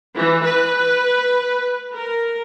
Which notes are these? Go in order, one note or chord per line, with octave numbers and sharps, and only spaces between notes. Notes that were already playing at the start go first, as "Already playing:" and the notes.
E3
B4
A#4